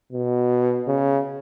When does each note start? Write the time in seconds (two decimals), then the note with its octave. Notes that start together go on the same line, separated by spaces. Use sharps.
0.12 B2
0.87 C#3